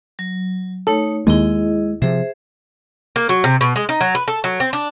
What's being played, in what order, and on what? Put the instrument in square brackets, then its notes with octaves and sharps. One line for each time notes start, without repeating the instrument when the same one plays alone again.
[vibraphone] F#3
[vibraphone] A3 D#4 C#5 [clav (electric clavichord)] A4
[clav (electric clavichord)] D#2 [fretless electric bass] G#3 [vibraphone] E4 G#4 D#5
[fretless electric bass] C3 F3 [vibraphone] G#4 C5 E5
[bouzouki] A#3
F#3
C3
B2
G#3
D#4
F#3
B4
A4
F#3
C4
D4